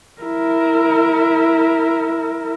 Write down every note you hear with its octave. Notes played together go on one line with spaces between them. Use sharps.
E4 A#4